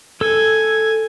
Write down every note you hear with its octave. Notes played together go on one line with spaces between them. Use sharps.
A4 G#5 E6